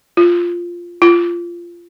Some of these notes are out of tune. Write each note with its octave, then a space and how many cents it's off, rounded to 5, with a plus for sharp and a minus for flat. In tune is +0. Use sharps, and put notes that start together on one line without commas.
F4 -5
F4 -15